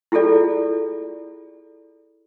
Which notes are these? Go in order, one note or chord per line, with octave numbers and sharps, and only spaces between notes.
E4 F4 G#4 A4 D5